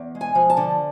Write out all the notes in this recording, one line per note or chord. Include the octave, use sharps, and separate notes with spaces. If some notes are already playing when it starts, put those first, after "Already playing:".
Already playing: E2
G#3
G#5
F3
A5
D3